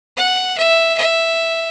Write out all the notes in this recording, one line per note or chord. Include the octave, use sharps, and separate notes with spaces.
F#5
E5
E5